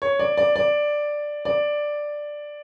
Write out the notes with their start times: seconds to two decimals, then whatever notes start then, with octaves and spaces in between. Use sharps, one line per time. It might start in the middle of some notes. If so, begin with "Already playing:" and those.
0.02 C#5
0.19 D5
0.37 D5
0.56 D5
1.45 D5